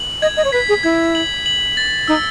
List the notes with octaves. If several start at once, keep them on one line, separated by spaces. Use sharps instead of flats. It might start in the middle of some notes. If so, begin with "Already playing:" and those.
Already playing: F#7
D#5 G#6
D#5
C#5
B4 B6
G#4
E4 G#6
F#7
F#7
A6
D#4 E6